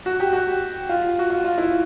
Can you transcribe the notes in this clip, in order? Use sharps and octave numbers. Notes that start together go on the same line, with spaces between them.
F#4
G4
F#4
F4
F#4
F4
F4
E4